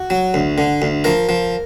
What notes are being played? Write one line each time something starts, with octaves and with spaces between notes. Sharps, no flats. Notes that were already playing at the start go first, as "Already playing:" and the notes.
Already playing: F#4
F#3
D2
D3
D2
F3 A#4
F3